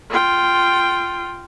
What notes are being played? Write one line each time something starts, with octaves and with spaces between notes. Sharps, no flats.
F4 G5